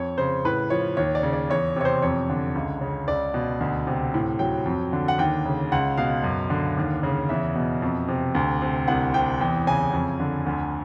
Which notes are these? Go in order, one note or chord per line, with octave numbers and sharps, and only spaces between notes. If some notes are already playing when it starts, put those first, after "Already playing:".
Already playing: F2 C#5
C#3 C5
A2 B4
F3 C#5
D#2 C#5
D5
C#3
D5
E2 C#5
C3 C#5
C5
F2 C#5
D3
C#2
C#3
C#2 D5
B2
D2
C3
A2
F#3 G5
F2
D3
F#5
D#2 G5
C#3
C#2 F#5
B2 F5
F#2
D3
D#2
C#3
E2 E5
B2
F2
C3
D2
C3
C2 F#5
C3 G5
E2 G5
C#3 G#5
F2
D3
D2